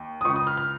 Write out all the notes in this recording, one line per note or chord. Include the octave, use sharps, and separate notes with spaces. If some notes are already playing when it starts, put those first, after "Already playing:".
Already playing: D#2
D#6
C#2 C#3 C#6
D#6
F6
F6